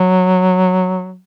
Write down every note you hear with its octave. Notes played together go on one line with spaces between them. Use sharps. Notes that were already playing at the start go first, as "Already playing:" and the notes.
Already playing: F#3